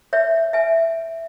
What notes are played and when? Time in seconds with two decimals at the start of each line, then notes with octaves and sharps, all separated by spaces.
0.13 C#5 E5
0.53 E5 G#5